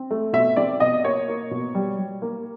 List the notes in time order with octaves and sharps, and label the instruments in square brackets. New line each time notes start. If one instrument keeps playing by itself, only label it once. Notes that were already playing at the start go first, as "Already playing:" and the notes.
Already playing: [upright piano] C4
A3
B2 E5
C4 D5
B2 D#5
A#3 C#5
A#3
B2
G3
G3
A#3